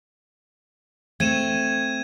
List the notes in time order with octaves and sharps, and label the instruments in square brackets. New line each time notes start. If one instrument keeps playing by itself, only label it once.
[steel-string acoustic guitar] A3 C4 [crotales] G#6 D#7 E7